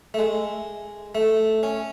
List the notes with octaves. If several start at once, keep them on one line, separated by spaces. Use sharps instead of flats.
A3
G#3
A3
C#4